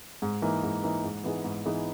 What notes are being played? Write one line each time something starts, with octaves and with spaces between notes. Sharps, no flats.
G#2
E3 A#3 D#4
G#2
E3 A#3 D#4
G#2
E3 B3 D#4 G#4
G#2
E3 B3 D#4 G#4